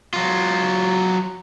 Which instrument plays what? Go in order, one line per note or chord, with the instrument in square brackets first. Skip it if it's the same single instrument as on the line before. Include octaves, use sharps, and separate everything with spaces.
[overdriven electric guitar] F#3 F4